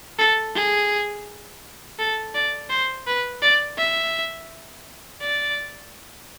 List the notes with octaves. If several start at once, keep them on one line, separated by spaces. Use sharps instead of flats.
A4
G#4
A4
D5
C5
B4
D5
E5
D5